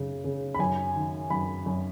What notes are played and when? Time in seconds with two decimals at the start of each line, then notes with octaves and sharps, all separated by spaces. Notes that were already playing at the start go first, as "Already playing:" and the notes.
Already playing: F#2 C#3
0.24 C#3
0.54 B5
0.59 F#2 G#5
0.96 D#3
1.30 F#2 B5
1.66 F#2